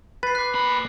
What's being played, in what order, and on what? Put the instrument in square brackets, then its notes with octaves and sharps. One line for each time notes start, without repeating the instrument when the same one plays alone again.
[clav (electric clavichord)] B4 [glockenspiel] A6 C7
[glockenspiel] D6 F#6
[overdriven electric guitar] A#2 B5